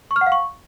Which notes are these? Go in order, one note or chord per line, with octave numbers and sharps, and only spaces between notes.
C#6
F6
F#5
F5
C#6